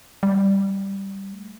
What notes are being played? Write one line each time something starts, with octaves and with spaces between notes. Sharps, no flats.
G3
A3